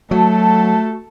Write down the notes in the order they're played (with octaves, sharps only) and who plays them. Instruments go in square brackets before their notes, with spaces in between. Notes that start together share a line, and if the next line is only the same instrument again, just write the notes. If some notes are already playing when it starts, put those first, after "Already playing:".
[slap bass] F#3 [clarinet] A3 [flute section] F#4 A5 [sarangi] A4